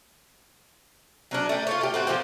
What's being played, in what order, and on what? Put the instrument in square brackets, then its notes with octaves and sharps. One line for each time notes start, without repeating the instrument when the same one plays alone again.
[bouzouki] F#3 C#4 D4
A3 G5
F4 A4 C#5
A3 G4
A3 C4 F#4
F3 G#3 C4 G4